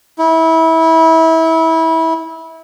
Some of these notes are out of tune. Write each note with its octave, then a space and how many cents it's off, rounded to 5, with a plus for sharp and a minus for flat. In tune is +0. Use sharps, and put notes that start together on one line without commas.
E4 -25